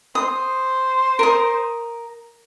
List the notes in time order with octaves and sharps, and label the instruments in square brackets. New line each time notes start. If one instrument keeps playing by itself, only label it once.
[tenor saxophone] C5 [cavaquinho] D#6
[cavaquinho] A#4 D#6